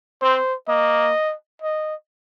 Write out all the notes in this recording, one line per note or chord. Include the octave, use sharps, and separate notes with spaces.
C4 C5
A#3 D#5
D#5